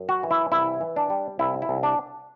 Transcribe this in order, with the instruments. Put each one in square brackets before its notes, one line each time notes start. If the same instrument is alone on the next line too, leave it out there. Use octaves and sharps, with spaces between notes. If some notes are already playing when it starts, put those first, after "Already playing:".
Already playing: [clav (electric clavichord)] F#2
F#4
E3
E4
C2 E4
E3
D4
G3
C2 E4
E4
C2
D4